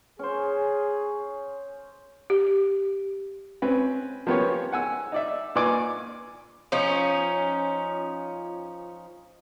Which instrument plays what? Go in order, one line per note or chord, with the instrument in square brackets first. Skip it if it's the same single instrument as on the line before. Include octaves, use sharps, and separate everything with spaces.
[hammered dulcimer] C#4 C5 [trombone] G#4
[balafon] G4
[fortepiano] C4 C#4 B4
F3 A#3 B3 C#4 G4 C#5
F#5 G#5 E6
D#4 D5 E5
A#2 B4 D5 G#5 D6
[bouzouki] F3 C#4 D#4